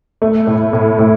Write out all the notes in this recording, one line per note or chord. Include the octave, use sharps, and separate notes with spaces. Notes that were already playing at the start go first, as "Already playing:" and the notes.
A3
A2
A2
A2